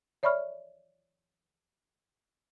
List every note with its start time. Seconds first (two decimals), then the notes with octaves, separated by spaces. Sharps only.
0.23 C#5 D5 E5 B5 C#6 F6